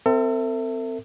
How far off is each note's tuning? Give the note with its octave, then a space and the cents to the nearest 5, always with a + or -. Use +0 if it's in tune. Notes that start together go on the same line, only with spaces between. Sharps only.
C4 -20 A4 +40 E5 +0